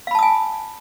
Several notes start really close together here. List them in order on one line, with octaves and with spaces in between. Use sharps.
F5 B5 A5 D#6 G#5